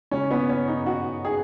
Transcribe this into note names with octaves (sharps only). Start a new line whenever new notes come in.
C#3 G#3 C#4
B3
C#4
D#4
F#4
G#4